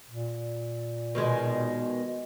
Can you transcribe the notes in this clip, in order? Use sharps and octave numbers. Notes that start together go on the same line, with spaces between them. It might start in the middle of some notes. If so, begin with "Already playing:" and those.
A#2
B2 D#3 G#3